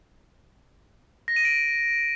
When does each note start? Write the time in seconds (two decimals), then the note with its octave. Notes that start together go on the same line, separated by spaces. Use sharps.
1.28 A#6
1.36 D#7
1.45 D7